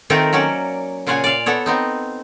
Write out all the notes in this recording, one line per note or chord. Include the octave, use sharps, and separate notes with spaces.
D#3 A3 C4 F4 A4 A#4
F#3 A#3 C#4 C#5 D5
A#2 C#3 F4 C#5 F#5 G#5
D5 F5
B3 A4 C#5
B3 C4 D#4